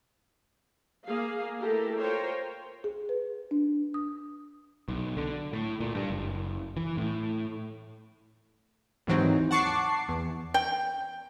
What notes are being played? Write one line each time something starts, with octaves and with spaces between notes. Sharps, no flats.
A#3 G#4 F5
A3 E4 G4 A4 A#4
F4 A#4 C5 C#5 G5
G#4
B4
D4
D#6
B1
D3
A2
A#2
G2
F#1
E3
A2
D#2 G#2 E3 F#3 C4 D#4
F#5 A5 C#6 D6 C7
E2
G5